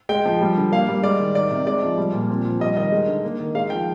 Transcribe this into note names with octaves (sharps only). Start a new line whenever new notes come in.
G#3 G5
F3
G3
D3
A#3 F5
G3
G#3 D5
D#3
D#3 D5
C3
G#3 D5
F3
G3
A#2
C4
F3
G3 D#5
D#3 D#5
G#3
D3
A#3
D#3
G#3 F5
F3 G5